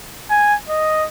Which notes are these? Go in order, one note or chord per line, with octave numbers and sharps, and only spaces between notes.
G#5
D#5